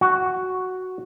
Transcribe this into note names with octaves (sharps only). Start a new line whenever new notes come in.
F#4